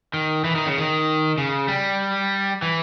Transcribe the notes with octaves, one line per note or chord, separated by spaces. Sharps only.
D#3
E3
D#3
C#3
D#3
C#3
G3
E3